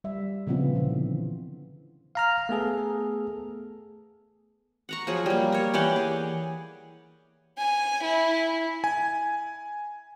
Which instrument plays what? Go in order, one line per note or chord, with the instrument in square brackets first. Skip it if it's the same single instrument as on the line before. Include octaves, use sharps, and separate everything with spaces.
[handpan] G3 E5
A#2 C#3 F3 B3 C4 F4
D3 E3
[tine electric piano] F5 A#5 F6
A3 B3 G#4 A4
[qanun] F#5 A#5 C#6
F3 F#3 G#4
G3 A#3
A#4 C#5
E3 G4 D5 F#5
G#4
[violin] G#5
E4
[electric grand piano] G#5